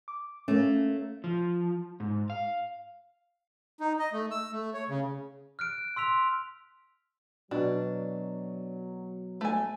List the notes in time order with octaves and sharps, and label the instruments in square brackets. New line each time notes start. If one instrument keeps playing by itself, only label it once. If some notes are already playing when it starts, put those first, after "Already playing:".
[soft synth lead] D6
[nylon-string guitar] A3 A#3 [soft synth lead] C#4
[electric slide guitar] F3
G#2
F5
[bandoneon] D#4
D#5
A3
E6
A3
C#5
C#3
[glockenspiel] F6 F#6 D7
C6 E6 B6 F7
[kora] B2 [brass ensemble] F#3 [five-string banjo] D4
[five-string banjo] A3 G#5